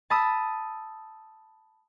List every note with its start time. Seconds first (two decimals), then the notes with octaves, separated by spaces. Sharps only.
0.10 A5 B5 D#6 E6